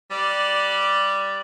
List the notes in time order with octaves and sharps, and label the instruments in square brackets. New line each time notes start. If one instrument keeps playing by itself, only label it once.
[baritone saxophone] G3 [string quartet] D5 F#6